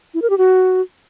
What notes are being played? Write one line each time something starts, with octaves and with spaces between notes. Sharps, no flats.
E4
A#4
G4
F#4